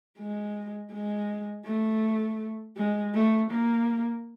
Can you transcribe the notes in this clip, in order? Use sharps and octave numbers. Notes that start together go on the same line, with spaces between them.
G#3
G#3
A3
G#3
A3
A#3